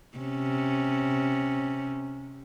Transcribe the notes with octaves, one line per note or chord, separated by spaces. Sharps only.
C3 C#4